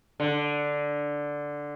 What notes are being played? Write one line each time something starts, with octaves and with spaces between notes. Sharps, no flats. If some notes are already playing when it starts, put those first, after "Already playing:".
D3